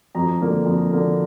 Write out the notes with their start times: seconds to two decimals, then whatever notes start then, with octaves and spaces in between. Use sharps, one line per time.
0.15 F2 A#5
0.41 D3 A#3
0.66 F2
0.91 D3 A#3